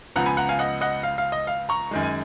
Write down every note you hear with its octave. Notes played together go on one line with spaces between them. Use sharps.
C#2 C#3 F3 B3 F#5 A#5
G#5 B5
F#5 A#5
F5 G#5
D#5 F#5
D#5 F#5
F5
F5
D#5
F5
A#5 C#6
F#2 D#3 G#3
G#5